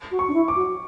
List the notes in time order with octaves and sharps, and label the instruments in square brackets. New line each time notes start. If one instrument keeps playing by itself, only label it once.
[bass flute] F#4
[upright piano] C#6
[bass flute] D4
E4
[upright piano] D6
[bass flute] F#4